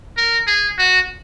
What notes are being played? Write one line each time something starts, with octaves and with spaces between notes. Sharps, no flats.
A#4
G#4
F#4